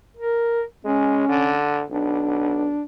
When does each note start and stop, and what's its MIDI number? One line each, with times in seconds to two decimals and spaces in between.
0.17 0.63 70
0.85 1.28 56
0.85 1.57 61
1.29 1.83 50
1.91 2.73 35
1.91 2.83 62